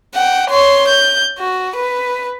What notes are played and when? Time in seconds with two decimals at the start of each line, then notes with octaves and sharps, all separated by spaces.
0.14 F#5 G5
0.50 C#5 C6
0.88 G6
1.39 F#4
1.76 B4